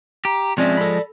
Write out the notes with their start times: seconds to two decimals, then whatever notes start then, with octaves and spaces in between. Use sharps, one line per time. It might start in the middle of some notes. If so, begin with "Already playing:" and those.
0.25 G4 A#5
0.58 F3 G#3 C4 C#4 D5 E5
0.77 A4 B5